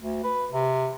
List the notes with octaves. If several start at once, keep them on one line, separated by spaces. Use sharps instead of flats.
D2
B4
C3